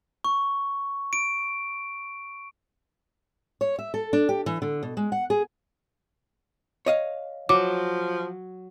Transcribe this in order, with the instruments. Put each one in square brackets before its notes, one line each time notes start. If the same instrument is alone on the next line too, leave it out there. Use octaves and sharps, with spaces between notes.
[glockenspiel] C#6
D7
[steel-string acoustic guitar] C#5
E5
A4
D4
G4
E3
D3
B2
G#3
F#5
G#4
[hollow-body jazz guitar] C#5 D#5 F5
[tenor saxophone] F3 [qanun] F#3 [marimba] D6